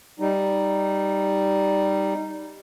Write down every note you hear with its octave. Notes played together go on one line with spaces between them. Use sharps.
G3 D#4